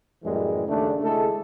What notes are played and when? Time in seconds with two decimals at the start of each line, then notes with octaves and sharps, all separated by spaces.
0.24 F#2 A2 E3 G3 G#3
0.67 D#2 C#3 A3 D4
1.01 C#3 G#3 A3 E4 A4